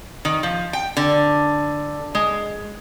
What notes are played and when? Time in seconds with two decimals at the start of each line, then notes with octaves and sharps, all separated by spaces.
0.25 D#3
0.43 F3
0.73 G5
0.97 D3
2.15 G#3